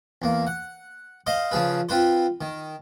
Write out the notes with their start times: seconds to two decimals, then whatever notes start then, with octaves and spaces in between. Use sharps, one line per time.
0.22 E2 A#3
0.47 F#5
1.27 C5 D#5 F5
1.51 C#3 F3 G#4 B4
1.89 C4 F4 B4 C5
2.41 D#3